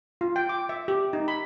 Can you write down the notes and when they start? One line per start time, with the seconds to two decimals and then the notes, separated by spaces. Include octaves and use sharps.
0.21 F4
0.36 G5
0.49 D6
0.69 E5
0.88 G4
1.13 D#4
1.28 B5